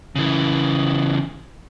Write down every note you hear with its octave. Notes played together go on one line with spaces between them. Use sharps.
C#3 E3